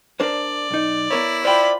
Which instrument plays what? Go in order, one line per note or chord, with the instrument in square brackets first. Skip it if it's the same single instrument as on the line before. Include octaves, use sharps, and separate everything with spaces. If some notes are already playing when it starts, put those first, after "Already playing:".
[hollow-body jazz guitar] D4 A#4 C5 [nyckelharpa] D5
[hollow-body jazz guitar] B1 D#4
[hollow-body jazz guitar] B3 A#4 C#5 [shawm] E4
[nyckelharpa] F4 B5 [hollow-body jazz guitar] C5 G5 [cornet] D5